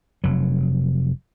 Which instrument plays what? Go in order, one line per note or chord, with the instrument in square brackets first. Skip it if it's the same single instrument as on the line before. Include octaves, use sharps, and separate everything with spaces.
[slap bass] F1 F#3